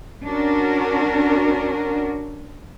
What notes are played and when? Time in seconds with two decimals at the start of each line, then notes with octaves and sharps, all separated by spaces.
0.25 C#4 D4 F#4 A#4